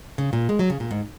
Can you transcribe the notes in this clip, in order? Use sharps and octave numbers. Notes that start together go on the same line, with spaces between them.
C#3
A#2
G#3
F#3
C#3
A#2
G#2